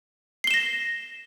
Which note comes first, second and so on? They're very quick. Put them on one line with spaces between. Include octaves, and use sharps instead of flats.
C7 G7 E7 A#6